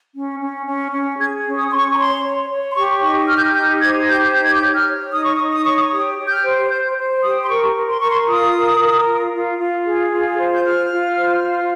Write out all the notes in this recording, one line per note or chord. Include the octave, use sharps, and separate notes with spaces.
C#4
C#4
C#4
C#4
G#4 G#6
C#4
D#6
C#4 C6
C#6
A#5
C#5 C6
C#5
C#5
C6
G4 C#6
D#4 C#6
G4 F6
G6
F6
D#4 G6
C5 G#6
G4 G6
D#4 G6
G#6
G6
C#5
F6
C#5
D#4 D#6
C#6
D#6
D#4
D#6
C#5 C#6
D#6
G4 D#6
G4
G6
F6
C5
C5 G6
C5
G4 D#6
C6
A#4 C#6
A#4
C6
A#4 C#6
C6
F4 D#6
A#4
A#4
F4
F4
F4
G#4
F4
C5
G6
F4 F6
F4
C5
F4